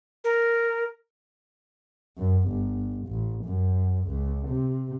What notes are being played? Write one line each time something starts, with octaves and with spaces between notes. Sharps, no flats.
A#4
F#2
G1
A1
F#2
C#2
C3